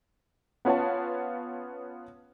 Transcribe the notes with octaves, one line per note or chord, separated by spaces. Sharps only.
B3 C#4 F4 C#5 F#5 A5